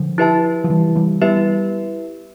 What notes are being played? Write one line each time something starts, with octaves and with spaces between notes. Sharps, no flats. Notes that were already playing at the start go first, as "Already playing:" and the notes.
Already playing: D3 F3
E4 G4 B4 E5 A5
F3
E3 G3
E3 G3
G3 B3 E4 G4 B4 E5